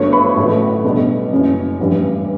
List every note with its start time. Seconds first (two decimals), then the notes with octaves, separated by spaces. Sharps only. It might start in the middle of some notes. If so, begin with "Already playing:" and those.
Already playing: G1 G2 F#3 A3 C#5 C#6
0.12 B4 B5
0.36 A1 A2 F#3 A3
0.84 B1 B2 G3 B3 D4
1.31 F#1 F#2 C#3
1.80 A1 G2 E3 G3